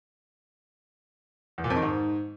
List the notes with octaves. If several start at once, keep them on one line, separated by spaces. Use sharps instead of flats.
E2
A#2
F2
D#3
G#2